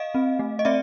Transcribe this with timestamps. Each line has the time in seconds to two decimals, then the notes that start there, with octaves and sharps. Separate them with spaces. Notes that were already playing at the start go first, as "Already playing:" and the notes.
Already playing: D#5 F5
0.15 C4
0.39 A3
0.59 D#5
0.65 C4 D5 E5